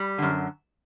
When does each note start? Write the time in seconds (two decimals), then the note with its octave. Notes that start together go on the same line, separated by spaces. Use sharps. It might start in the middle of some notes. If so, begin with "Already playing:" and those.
Already playing: G3
0.18 F#2 D3